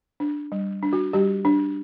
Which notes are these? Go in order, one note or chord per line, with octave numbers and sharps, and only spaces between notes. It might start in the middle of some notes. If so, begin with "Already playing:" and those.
D4
G3
D4
F#4
G3 G4
D4